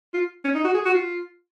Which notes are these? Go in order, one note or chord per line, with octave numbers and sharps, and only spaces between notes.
F4
C#4
D#4
F#4
G#4
F#4
F4